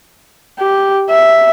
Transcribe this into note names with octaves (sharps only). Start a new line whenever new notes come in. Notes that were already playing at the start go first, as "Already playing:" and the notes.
G4
E5